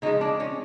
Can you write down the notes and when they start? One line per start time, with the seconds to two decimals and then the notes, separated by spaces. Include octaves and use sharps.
0.02 C#3 F3 G#3 D#4
0.21 D4
0.40 C#4